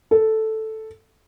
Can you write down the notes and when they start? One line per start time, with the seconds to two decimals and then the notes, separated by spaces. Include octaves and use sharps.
0.11 A4